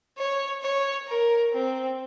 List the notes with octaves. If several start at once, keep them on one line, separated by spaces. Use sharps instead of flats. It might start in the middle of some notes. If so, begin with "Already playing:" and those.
C#5
C#5
A#4
C4